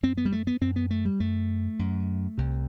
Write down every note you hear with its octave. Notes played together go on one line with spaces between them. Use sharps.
F#2 C4
B3
G3
A3
B3
F#2 C4
B3
A3
G3
F#2 A3
F#2
C2 C3